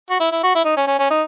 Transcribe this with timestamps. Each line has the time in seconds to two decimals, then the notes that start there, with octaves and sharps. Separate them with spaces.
0.10 F#4
0.20 E4
0.32 E4
0.43 F#4
0.55 E4
0.65 D#4
0.77 C#4
0.87 C#4
0.99 C#4
1.10 D#4